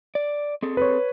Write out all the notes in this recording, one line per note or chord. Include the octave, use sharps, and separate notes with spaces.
D5
C4 G#4 A4
B4 C#5